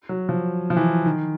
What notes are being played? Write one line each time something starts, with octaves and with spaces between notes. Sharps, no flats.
F#3
F3
F3
E3
D#3